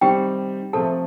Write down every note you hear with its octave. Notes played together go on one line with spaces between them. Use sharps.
C3 D#3 G3 C4 G4 G5
C3 F3 A3 C4 A4 A5